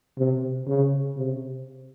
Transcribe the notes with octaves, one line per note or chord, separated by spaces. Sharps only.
C3
C#3
C3